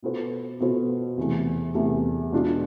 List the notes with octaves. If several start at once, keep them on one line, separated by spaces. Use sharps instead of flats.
B2 B3 F4 A4 C5
B2 B3 F4 A4 C5
E2 C3 E3 A3
E2 C3 E3 A3
B2 G#3 D4 F4